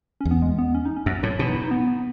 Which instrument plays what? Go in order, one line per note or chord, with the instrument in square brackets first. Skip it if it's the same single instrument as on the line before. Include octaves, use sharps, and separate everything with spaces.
[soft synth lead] C#4
[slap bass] E2
[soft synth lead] B3
G#3
B3
C#4
D#4
C#4
[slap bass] F#2
[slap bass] A2 [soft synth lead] F#3
[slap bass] B2 [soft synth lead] E3
[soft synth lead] D#4
E4
D#4
B3
B3